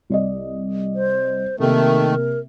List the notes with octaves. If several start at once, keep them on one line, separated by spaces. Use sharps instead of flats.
C2 D5 D#5
C5
C3 D#3 A3 A#3 A#4